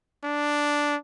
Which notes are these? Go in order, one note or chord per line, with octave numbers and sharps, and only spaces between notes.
D4